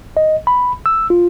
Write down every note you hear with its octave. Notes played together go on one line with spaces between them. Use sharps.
D#5
B5
E6
F4